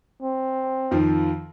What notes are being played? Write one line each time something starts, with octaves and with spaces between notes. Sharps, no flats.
C4
F2 D#3 F3